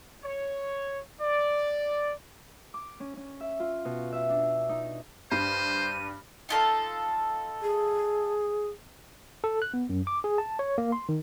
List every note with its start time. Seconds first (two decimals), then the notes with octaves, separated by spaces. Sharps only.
0.23 C#5
1.21 D5
2.74 D6
3.00 C#4
3.17 C#4
3.41 E5
3.60 F4
3.85 B2
4.13 E5
4.30 D4
4.69 D#4
5.31 G2 C5 D#7
6.49 D#4 F4 A4
7.62 G#4
9.44 A4
9.62 F#6
9.74 B3
9.89 F#2
10.07 D6
10.24 G#4
10.38 A5
10.59 C#5
10.78 A#3
10.92 C6
11.09 D#3